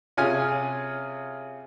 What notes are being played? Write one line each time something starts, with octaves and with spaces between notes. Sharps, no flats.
C3 C#4 F4 G#4 G#5 F6